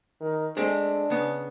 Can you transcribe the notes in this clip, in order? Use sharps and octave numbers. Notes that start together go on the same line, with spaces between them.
D#3
G#3 A3 C4 D4
C#3 B3